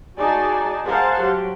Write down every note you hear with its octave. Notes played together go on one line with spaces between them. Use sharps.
D#4 F#4 G#4 D5 G#5 A5
G#4 A#4 C5 F5 F#5 A5
F#3 G4